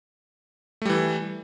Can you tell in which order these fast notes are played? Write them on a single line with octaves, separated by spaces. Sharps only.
A3 G3 E3